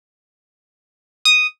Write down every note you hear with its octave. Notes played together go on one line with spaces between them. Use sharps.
D#6